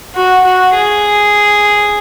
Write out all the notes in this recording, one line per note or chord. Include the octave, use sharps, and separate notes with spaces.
F#4
F#4
G#4